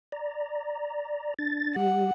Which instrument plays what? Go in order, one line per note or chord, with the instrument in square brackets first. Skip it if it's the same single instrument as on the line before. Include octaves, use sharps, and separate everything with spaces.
[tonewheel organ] D5 A#5
D4 A6
[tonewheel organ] G3 G4 [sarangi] F#5